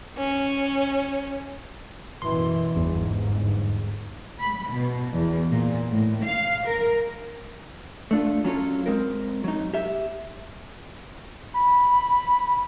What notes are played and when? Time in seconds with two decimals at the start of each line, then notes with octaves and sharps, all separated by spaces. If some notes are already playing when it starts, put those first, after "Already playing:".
0.17 C#4
2.22 F#2 B2 E3 C6
2.76 G1 E2 G#2
4.40 B5
4.70 B2
5.13 E2
5.50 A#2
5.91 A2
6.23 F5
6.66 A#4
8.11 A3 D4 F4
8.44 F#3 C#4 F4 A4
8.86 G#3 C4 F4 A#4
9.44 F#3 D#4
9.74 G4 E5
11.54 B5